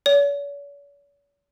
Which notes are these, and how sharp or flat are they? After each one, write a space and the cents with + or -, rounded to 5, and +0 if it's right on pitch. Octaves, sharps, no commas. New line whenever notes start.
C#5 +45